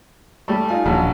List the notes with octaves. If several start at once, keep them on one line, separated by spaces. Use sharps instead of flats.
G3 A3
D#4 F4 G#5
D#1 A#1 F#3